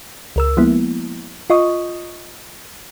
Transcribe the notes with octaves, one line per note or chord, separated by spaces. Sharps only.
C#2 A#4 E6
F3 G#3 A#3 B3 E4
F4 D#5 C#6 D#6